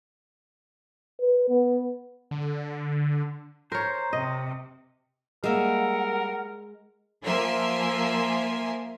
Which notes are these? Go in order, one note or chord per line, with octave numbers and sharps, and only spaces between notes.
B4
B3
D3
A#4 C5 C#5 A#5
C3 D#5
G3 G#3 A#3 A#4 E5 F#5
F3 A#3 A#4 E5 G#5 C6